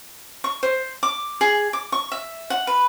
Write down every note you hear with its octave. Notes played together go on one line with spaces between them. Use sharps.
C#6
C5
D6
G#4
D6
C#6
E5
F#5
B4